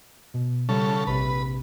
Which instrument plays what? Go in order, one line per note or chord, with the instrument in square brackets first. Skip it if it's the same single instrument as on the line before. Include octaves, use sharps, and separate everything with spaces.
[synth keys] B2
[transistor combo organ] C#3 A4 [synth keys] G3
[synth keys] A#1 C3 [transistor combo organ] B4